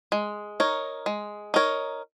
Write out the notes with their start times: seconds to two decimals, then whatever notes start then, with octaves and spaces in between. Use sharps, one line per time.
0.12 G#3
0.60 D#4 A#4 C#5
1.06 G#3
1.54 D#4 A#4 C#5